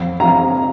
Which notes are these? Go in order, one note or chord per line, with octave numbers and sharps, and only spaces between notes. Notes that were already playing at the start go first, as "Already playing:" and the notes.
Already playing: F2
C3 F3 A#5